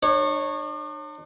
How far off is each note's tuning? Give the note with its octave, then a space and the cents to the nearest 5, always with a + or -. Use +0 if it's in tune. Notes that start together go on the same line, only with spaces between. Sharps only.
D4 +45 C#5 -15